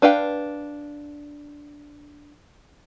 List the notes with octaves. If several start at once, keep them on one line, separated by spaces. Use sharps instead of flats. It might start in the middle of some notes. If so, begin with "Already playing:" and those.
D4 B4 F5 G5